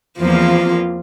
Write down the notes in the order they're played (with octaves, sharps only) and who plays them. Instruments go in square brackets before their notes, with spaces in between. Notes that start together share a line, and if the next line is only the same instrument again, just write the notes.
[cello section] E2 A#3 C4 [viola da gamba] F3 F4